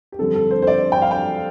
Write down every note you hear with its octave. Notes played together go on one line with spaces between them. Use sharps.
G4
G2 D3 F3 C4 A4
A4
C5
C5
D5
G5
F5
G5